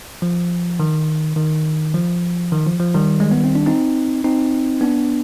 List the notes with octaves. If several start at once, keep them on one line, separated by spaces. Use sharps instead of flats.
F3
D#3
D#3
F3
D#3
F3
F3
D#3 G3
G#3
B3
C4
D4
C4 D#4
C4 D#4
B3 D4